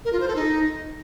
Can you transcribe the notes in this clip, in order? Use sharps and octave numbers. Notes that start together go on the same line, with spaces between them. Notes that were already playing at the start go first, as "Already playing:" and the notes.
A#4
F4
C5
A4
D#4